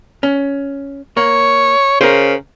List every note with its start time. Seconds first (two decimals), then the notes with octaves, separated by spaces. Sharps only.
0.23 C#4
1.17 A#3 C#5
2.01 C#3 A#4 C5